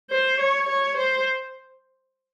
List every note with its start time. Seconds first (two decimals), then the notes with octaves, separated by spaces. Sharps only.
0.11 C5
0.40 C#5
0.68 C#5
0.97 C5